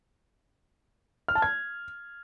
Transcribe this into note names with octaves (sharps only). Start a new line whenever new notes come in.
F6
A5
G#6